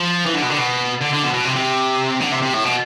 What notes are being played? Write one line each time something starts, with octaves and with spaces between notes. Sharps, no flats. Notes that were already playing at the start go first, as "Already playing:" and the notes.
Already playing: F3
E3
D3
B2
D3
B2
D3
D3
B2
B2
C3
C3
D3
C3
C3
A2
B2